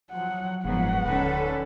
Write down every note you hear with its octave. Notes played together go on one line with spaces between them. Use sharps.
F3 F#3 F#5
F#1 G#2 F3 F#3 G#3 A#3 B3 F#5
D1 D3 C#4 D#4 A4 B4